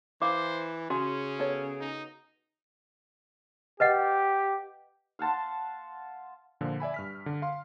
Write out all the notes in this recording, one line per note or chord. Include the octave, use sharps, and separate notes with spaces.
E3 C5 F5 D6
C#3 C#4 F#4 G#4
B3 A4 C#5
D#4
G4 B4 D#5 F#5
F5 F#5 A5 C6
A#2 D3 F3
D5 E5 G#5 B5
G2 F6 B6
D3
F5 C6